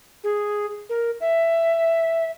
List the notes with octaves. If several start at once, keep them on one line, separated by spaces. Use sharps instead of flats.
G#4
A#4
E5